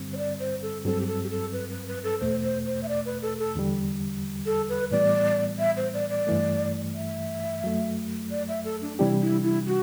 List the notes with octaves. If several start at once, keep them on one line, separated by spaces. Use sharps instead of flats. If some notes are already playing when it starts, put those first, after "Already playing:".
Already playing: G2 D3 G3 C4
C5
D5
C5
A4
G2 F#3 C4 A4
G4
A4
G4
A4
B4
B4
B4
A4
E2 B2 A3 C5
C5
C5
E5
D5
B4
A4
A4
E2 D3 G3
A4
B4
A2 E3 G3 B3 D5
E5
C5
D5
D5
G2 E3 A3
E5
F#2 F#3 A3
D5
E5
A4
D4
C3 E3 G3 D4 E4 G4
E4
E4
F#4